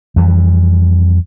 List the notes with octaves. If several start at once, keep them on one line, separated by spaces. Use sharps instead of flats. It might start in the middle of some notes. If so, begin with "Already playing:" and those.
F2 E3 G3